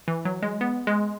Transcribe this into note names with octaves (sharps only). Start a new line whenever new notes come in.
E3
F#3
G#3
B3
G#3